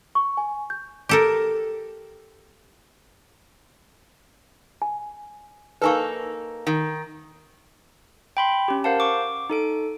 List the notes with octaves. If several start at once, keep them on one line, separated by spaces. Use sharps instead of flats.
C#6
G#5
G6
G4 A4 A#4
G#5
A#3 D#4 A4 B4 G#5 C#6
D#3
G5 B5 C6
C#4 G4
A#4 C5 F5 F#5 A5
C#6 D6
D#4 A4 D7